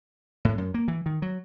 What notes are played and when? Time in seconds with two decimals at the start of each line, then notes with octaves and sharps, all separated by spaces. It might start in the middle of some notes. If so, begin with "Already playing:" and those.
0.45 A2
0.58 F#2
0.74 A#3
0.88 E3
1.06 D#3
1.22 F#3